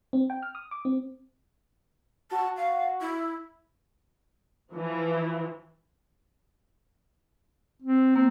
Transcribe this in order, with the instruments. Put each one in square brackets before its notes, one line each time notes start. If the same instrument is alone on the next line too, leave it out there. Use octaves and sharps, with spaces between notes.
[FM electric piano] C4
G5
F6
D#6
D6
C4
[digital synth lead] F#4 [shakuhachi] A5
[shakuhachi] F5
E4
[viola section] E3 F3
[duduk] C4
[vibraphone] A#3 [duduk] C4